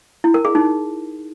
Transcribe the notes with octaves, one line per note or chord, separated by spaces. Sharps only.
E4
A#4
G#4
D#4